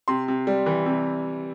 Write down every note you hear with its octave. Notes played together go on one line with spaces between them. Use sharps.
C3 C6
C3
G3
E3
C3